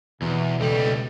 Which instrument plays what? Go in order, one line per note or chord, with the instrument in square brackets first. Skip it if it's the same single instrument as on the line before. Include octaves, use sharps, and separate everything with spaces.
[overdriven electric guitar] E2 [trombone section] B2
[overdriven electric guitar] C#2 G3 [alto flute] A4